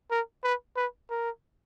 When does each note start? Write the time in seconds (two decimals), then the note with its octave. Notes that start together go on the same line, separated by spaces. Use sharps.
0.11 A#4
0.44 B4
0.76 B4
1.10 A#4